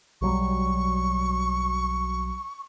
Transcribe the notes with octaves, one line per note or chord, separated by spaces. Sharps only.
B1 F#3 G3 C#6